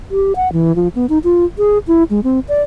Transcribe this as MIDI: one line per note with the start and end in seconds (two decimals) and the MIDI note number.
0.11 0.33 67
0.36 0.51 78
0.53 0.75 52
0.76 0.88 53
0.95 1.06 59
1.09 1.18 63
1.24 1.45 65
1.58 1.78 68
1.88 2.03 64
2.10 2.20 56
2.24 2.40 60
2.48 2.62 74